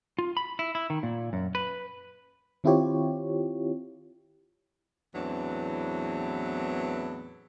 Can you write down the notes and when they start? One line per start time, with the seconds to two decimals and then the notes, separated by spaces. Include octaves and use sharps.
0.19 F4
0.37 B5
0.59 E4
0.75 E4
0.90 D#3
1.03 A#2
1.33 F#2
1.55 B4
2.64 D#3 C4 E4 F4 G4 C#5
5.15 E2 A2 E3 F#3 C4 D4